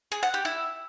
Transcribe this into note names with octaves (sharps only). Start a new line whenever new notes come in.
G#4
F#5
G4
E4